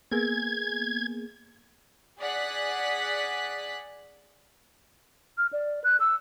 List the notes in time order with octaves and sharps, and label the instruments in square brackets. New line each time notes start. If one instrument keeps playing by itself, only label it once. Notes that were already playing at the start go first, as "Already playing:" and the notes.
[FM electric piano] A#3 B3 G#4 [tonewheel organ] G#6
[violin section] G#4 D5 F#5 F#6 B6
[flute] F6
D5
F#6
E6